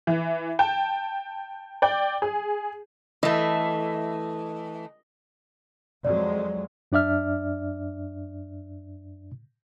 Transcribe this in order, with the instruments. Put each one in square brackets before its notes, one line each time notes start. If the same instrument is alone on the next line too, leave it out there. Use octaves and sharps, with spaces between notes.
[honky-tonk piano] E3
G5 A5
D5 G5
G#4
[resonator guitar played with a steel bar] E3 A3 [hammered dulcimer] D#5
[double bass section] F2 F#3 G#3 [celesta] D5
[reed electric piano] F#2 D4 D5 E5 F6